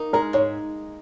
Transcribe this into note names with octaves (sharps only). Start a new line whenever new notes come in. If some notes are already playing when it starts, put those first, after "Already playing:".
Already playing: A#3 D#4
G#3 A#4
G#2 C#5